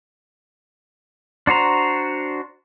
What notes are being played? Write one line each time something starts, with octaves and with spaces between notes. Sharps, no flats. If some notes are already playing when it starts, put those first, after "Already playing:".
D4 F#4 C5 A#5